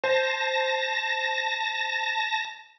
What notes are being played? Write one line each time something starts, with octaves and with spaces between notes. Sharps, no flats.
C5 A5 A#6